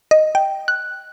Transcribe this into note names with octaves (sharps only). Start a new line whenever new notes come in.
D#5
G5
F#6